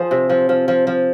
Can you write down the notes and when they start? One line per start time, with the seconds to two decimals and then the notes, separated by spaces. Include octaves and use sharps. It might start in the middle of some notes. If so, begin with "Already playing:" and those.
Already playing: F3 G#4 C5
0.11 C3
0.30 F3
0.49 F3
0.68 F3
0.87 F3